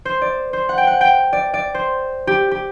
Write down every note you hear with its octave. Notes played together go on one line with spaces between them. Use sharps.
C5
D5
C5
F#5
G5
F#5
G5
D5
D5
C5
G4
G4